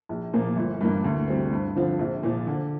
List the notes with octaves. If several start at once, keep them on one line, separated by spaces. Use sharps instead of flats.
A#1
A#2 F3 A#3
G1
G2 E3 A#3
D2
C3 G3 C4
G2
D3 F3 C4 F4
A#1
A#2 F3
D3